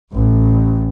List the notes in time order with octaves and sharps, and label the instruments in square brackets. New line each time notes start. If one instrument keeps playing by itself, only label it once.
[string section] A1